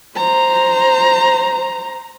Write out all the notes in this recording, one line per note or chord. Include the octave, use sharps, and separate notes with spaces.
C5 A#5